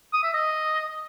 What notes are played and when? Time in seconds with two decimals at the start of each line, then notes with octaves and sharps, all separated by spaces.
0.13 D#6
0.23 E5
0.34 D#5